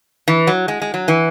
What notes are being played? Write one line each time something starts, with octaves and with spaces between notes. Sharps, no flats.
E3
F#3
G#3
G#3
F#3
E3